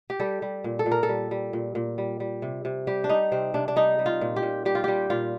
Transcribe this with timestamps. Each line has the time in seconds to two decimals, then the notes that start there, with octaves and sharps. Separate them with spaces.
0.10 G4
0.20 G3 A4
0.42 G3
0.64 A#2
0.79 A4
0.86 A#2
0.92 A#4
1.03 A4
1.09 G3
1.31 G3
1.53 A#2
1.75 A#2
1.98 G3
2.20 G3
2.42 C3
2.65 C3
2.87 G3 G4
3.04 D4
3.09 G3 D#4
3.32 C3 C4
3.54 C3 D4
3.68 D4
3.76 G3 D#4
3.99 G3
4.06 F4
4.21 A#2
4.36 G4
4.43 A#2
4.65 G3 G4
4.75 F4
4.84 G3 G4
5.10 A#2 F4